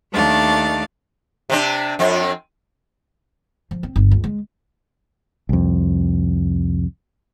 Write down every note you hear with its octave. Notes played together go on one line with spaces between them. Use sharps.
D#2 D#3 A3 D4 F5 A6
C3 C4 D4
F2 C4
F3
C4
G1
C#2
G#3
C2 F2